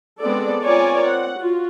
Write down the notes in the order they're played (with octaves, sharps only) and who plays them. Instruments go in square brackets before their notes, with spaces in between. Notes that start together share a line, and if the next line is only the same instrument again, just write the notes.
[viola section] G#3 B3 C4 D4 A4 D5
C4 F4 A#4 C#5 D5 G#5
C4 F#5
F4 F#4